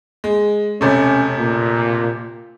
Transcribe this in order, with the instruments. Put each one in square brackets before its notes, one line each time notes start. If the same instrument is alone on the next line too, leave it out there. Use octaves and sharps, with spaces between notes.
[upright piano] G#3
[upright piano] E1 C3 A3 [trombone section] C#4
[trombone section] A#2